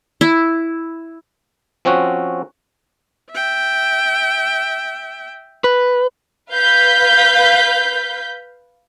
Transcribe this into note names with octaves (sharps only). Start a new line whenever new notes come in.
E4
F3 C4 C#4 F#4
E5 G5
B4
B4 F5 G6 B6